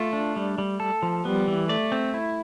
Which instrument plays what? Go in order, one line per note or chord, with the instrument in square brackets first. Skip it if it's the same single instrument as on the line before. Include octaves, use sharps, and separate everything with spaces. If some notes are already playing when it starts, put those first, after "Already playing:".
Already playing: [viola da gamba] A3 [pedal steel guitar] F4
[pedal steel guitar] D4
G3
G3
A4
F3
[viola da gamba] G3 [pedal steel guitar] B3
[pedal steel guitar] E3
[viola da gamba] A3 [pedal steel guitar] D5
[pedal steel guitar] C4
E4